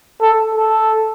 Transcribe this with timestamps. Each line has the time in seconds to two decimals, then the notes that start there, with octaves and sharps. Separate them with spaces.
0.22 A4
0.55 A4